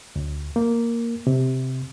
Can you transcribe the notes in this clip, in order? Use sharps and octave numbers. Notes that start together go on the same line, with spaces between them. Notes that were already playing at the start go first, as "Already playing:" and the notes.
D2
A#3
C3